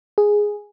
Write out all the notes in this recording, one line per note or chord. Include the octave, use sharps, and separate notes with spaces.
G#4